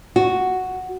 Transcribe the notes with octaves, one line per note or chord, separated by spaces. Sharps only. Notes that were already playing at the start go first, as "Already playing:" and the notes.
F#4